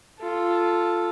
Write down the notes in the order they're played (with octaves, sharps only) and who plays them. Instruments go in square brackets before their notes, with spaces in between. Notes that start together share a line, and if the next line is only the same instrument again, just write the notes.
[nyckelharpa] F4 A4